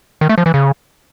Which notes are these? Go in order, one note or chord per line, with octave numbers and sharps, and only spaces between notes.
D#3
A3
F3
E3
C#3